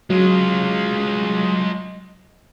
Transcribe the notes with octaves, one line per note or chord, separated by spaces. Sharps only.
F#3 G#3 F4